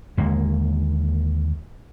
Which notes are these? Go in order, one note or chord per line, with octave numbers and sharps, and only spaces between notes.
D#2 D3 G#3 A#3